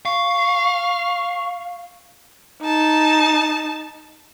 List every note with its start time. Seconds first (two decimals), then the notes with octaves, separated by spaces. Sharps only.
0.05 F5 C#6
2.62 D#4 A5